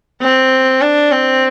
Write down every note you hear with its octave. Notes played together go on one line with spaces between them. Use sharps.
C4
D4
C4